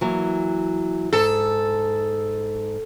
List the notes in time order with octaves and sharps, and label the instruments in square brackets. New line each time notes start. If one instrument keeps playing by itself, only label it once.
[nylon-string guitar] E3 F#3 A#3
[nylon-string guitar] G#2 [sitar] A4